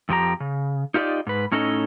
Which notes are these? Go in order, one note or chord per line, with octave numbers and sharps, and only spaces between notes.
F2 F3 G4 A#5
C#3
D#4 F4 G4 C5 D5 D#5
G#2 B4
A2 C#4 D#4 A4 D5 D#5